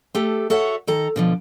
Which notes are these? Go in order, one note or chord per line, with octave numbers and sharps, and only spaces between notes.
A3 G4 A4
F#4 A4 C#5 E5 F#5
D#3 A4 A#5
B2 D3 F3